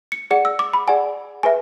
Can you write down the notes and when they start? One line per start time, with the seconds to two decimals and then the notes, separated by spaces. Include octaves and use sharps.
0.12 C#7
0.31 G#4 D5 F#5 C#7
0.45 E6
0.59 D6
0.73 B5
0.87 G#4 D5 F#5 G#5
1.43 G#4 B4 E5 G#5